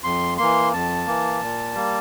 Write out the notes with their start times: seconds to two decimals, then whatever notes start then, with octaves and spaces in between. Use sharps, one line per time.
0.03 F2 C6
0.38 E3 A#3 C6
0.72 F2 A5
1.07 E3 A#3
1.42 A#2
1.75 G3 A#3